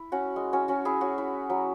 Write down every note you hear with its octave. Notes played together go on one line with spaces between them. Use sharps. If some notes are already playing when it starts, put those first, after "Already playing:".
Already playing: E4
C#4 F#4
G#3
C#4 F#4
C#4 F#4
E4 G#4
C#4 F#4
E4
F#3